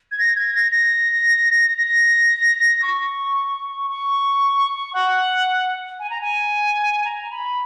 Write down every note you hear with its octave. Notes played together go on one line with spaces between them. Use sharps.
G#6
A#6
G#6
A#6
A#6
A#6
C#6
C#6
F#5
G#5
A#5
G#5
A#5
B5